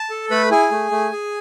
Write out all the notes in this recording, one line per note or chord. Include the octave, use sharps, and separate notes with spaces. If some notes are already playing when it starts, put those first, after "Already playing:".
Already playing: A5
A4
A3 B4 B5
E4 G#4 G#5
A3
A3
G#4